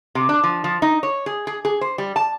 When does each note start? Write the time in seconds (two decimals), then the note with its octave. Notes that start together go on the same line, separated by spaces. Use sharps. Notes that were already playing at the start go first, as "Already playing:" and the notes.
0.15 C3
0.29 D4
0.44 F3
0.64 F3
0.82 D#4
1.03 C#5
1.26 G#4
1.47 G#4
1.65 G#4
1.81 C5
1.98 G3
2.16 A5